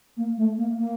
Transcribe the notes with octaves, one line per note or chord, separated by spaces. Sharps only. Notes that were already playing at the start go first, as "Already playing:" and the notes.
A#3
A3
A#3
A#3